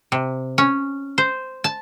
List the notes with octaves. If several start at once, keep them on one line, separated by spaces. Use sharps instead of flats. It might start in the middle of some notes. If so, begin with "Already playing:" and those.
C3
C#4
C5
A5